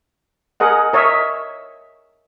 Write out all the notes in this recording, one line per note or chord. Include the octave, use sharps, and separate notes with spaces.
G#4 A#4 D#5 F#5
A#4 C#5 D#5 E5